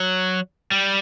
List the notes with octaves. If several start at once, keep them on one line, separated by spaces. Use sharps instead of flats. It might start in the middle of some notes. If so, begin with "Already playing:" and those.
Already playing: F#3
G3